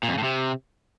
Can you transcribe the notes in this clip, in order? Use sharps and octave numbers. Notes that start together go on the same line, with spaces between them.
A#2
F2
C#3
A2
C3